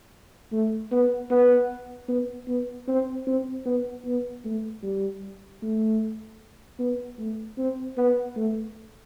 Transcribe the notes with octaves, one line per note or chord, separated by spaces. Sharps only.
A3
B3
B3
B3
B3
C4
C4
B3
B3
A3
G3
A3
B3
A3
C4
B3
A3